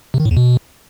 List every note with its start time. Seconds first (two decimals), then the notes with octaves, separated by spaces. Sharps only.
0.14 C3
0.20 D#3
0.25 A2
0.31 E2
0.37 B2